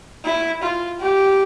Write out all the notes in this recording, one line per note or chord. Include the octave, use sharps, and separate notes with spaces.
E4
F4
G4